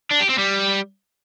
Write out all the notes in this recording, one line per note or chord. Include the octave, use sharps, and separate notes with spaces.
D4
G4
C4
G3